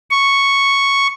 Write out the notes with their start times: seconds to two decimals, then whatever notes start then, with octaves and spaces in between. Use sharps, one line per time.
0.10 C#6